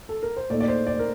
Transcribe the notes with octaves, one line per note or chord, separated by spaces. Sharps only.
A4
A#4
C5
A#2 A3 D#4 D5
D5
C5
D5
A#4